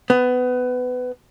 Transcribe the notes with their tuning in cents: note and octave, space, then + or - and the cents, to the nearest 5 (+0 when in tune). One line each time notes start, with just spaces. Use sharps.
B3 +20